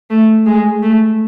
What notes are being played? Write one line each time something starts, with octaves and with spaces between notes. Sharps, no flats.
A3
G#3
A3